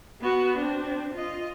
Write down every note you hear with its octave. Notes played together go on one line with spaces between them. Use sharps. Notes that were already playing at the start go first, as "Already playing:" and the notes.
B3 F#4
C4 D4
F4 D#5